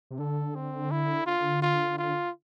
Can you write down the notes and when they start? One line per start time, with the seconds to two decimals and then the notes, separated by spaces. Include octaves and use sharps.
0.11 C3
0.19 D3 A4
0.55 C4
0.91 E4
1.26 F4
1.62 F4
1.98 F4